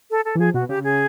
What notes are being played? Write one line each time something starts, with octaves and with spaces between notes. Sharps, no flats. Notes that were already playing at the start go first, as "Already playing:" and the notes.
A4
A4
E3
F3 G#4
B2 F#4
C#3 G4
G#4